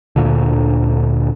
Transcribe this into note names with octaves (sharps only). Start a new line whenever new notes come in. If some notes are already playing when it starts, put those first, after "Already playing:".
D2 A#2 D3